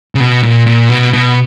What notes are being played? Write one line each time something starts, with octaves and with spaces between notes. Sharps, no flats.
C#3
B2
A#2
A#2
B2
B2